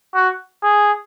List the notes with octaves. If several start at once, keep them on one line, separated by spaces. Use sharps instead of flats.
F#4
G#4